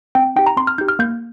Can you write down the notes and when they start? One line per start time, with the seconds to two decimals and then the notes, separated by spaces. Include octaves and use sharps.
0.15 C4 G5
0.36 D#4 G4 G5
0.46 A#5
0.57 C4 C6
0.67 F6
0.78 D#4 G4 G6
0.88 F6
0.99 A#3 G6